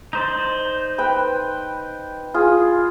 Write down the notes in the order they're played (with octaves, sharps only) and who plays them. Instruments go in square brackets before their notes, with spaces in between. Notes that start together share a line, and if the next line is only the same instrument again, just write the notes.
[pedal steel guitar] D#4 C5 D5
[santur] B4 G5
F4 G#4